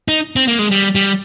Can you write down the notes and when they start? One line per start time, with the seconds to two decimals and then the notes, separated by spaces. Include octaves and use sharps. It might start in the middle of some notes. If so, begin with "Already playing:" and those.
0.08 D#4
0.36 C4
0.47 A#3
0.59 G#3
0.71 G3
0.95 G3